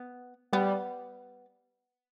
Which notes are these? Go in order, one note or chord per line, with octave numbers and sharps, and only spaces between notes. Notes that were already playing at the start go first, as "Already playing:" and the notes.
Already playing: B3
G3 B3